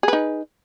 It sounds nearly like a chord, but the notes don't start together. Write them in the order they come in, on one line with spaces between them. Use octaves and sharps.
G#4 B4 D#4